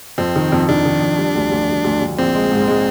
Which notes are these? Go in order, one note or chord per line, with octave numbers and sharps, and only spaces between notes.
F2 C4
D#3
F2
D#3 D4
D#3
F2
G3
D2
D2
D2
D2
D2
A#1 C4
G#3
G#2
G#3